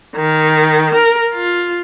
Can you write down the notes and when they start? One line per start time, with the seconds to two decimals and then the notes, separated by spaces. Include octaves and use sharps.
0.16 D#3
0.94 A#4
1.33 F4